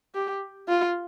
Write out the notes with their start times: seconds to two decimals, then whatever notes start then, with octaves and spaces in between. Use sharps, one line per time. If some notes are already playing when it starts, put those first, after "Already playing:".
0.15 G4
0.68 F4